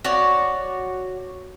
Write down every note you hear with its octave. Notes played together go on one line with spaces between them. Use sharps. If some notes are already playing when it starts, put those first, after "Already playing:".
F#4 C#5 D5